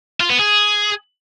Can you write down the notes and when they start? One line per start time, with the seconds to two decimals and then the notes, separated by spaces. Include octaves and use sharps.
0.20 F4
0.30 B3
0.40 G#4